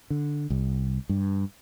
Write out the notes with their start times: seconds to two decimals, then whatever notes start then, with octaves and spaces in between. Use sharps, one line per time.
0.10 D3
0.50 C2
1.09 G2